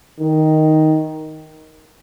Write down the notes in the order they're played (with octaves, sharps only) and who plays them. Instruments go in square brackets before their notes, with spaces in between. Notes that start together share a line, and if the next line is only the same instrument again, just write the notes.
[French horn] D#3